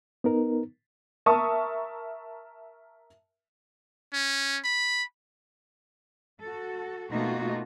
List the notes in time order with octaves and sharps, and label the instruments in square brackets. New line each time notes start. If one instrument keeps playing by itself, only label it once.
[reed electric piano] B3 D#4 A#4
[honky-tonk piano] A#4 E5 A5 C#6 D#6
[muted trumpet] C#4
B5
[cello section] F#4 A4
B2 A3 A#3 D#4 F4 F#4